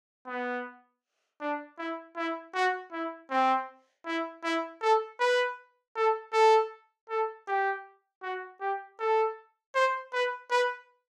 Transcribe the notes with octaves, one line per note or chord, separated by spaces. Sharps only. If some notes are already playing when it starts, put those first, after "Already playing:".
B3
D4
E4
E4
F#4
E4
C4
E4
E4
A4
B4
A4
A4
A4
G4
F#4
G4
A4
C5
B4
B4